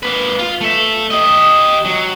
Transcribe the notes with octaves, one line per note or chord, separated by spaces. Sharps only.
A#3 B4
F4
A3 E5
G4 D#5
F#3